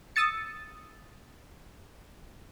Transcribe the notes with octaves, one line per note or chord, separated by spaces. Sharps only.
D#6 E6 A6 C#7